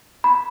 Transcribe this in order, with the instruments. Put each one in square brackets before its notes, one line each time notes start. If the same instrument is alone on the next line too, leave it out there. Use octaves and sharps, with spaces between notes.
[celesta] B5